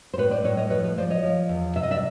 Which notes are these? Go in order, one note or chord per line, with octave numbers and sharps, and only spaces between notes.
C5
A2 B4 C#5
C5 D5
A2 B4 C#5
C#5 D#5
F3 B4 C#5
B4 C#5
F3 C5 D5
C#5 D#5
F3
E2
C3 E5
D#5
D5 E5